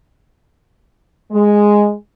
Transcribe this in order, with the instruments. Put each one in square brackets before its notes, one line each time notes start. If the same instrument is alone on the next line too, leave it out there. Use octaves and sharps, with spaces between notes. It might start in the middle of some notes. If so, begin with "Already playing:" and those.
[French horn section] G#3